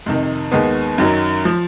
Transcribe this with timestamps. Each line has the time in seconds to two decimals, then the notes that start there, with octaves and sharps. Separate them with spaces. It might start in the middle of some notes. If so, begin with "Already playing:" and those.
0.06 F2 C3 D#3
0.52 D#2 D#3 G#3 B3
0.98 F#2 D#3 F#3
1.45 F3